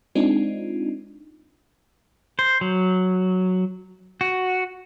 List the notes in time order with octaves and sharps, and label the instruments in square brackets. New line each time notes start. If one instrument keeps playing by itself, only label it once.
[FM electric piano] G#3 C4 D4 D#4 F4
[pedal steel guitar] C5
F#3
F#4